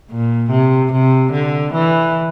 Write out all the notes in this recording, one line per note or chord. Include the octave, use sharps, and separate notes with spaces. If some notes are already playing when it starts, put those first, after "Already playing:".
A#2
C3
C3
D3
E3